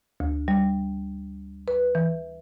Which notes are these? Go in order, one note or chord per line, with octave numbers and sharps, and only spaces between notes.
D2
G3
B4
E3